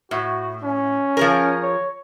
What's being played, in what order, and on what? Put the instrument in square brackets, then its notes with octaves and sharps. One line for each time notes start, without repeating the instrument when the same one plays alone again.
[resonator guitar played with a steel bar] A2 [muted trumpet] F#4
[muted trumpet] C#4
[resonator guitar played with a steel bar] F3 G#4 A#4
[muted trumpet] C#5